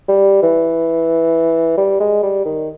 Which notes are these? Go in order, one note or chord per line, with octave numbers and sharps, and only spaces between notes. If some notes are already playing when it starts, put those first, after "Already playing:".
G3
E3
G3
G#3
G3
D#3